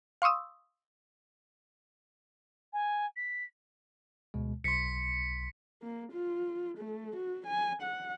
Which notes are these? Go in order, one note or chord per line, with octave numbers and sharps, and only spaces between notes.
F5 C6 C#6 D#6 E6
G#5
B6
D2 B2 G#3
B1 C6 B6 C#7
A#3
F4
A3
F#4
G#5
F#5